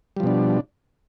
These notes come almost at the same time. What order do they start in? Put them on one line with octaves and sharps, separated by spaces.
G3 F3 B2 D4